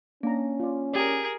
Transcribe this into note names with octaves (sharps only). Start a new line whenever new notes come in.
A#3 C#4 D4 A#5
F4 D5
G4 G#4 A#4 D5